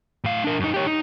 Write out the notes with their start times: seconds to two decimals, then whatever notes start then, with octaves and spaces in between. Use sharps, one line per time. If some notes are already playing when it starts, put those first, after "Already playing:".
0.24 A2 F5
0.44 D4 A#4
0.60 F#2 D#4
0.74 G4 C#5
0.87 D#4